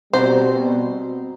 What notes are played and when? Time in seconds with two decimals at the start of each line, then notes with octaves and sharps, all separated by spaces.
0.13 B2 G3 C4 F#4 C5 A#5